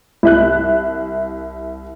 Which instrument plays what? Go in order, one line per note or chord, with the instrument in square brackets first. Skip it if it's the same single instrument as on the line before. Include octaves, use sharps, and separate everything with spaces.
[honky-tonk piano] C2 E5 F#6